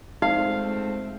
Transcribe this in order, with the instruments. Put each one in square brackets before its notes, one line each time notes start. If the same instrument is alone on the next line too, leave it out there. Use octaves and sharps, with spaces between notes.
[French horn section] F3 A3 C4 [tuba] G#3 [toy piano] D#4 [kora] F5